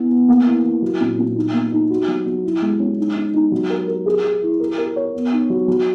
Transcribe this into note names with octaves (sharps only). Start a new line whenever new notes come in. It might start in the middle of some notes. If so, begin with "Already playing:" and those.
Already playing: B3 E4
B3
A#3
E3
E3
F#3
A#2
A#2
D#4
A#3
D#4
F#4
F#3
F#3
E4
G#3
C#4
D#4
D#4
D#4
F#3
A#4
A#4
G#4
G#4
E4
A#4
A#4
C#5
B3
D#4
F#3
F#3